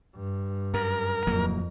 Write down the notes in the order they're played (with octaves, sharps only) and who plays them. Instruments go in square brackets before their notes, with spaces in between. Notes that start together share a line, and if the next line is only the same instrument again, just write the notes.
[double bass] G2
[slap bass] F#2 [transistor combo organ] A#4
[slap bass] D1 F#3 A#3 [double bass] F2